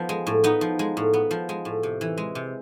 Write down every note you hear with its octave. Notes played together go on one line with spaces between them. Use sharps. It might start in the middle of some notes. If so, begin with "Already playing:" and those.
Already playing: F3 B3
G#3
A2
B3 D#4
F3
G#3
A2
B3
F3
G#3
A2
C3
E3
G#3
C3